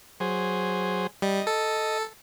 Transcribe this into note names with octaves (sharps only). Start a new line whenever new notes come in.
F#3 G#4 C5
G3 D#5
A4